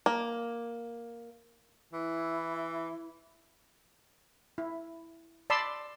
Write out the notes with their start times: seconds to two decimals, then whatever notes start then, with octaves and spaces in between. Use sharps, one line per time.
0.06 A#3
1.93 E3 E4
4.58 E4
5.50 D5 A5 B5 C6 E6